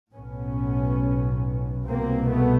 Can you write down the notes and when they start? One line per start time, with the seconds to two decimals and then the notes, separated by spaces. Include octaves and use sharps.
0.14 B1 A2 B3 C#4
1.86 C2 B2 A#3 C4
2.29 A3 B3